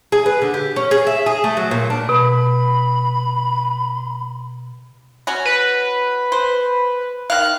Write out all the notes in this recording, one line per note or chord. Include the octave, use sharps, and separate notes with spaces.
G#4
B4
D3
G4
C#4
G#4
E5
G#4
A3
F#3
A#2
D4
B2 B5
C#4 F#4
B4
C5
D#3 F5 F#6